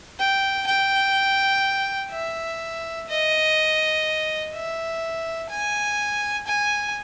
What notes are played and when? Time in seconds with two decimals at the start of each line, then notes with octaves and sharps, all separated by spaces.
0.19 G5
0.67 G5
2.11 E5
3.09 D#5
4.54 E5
5.49 G#5
6.47 G#5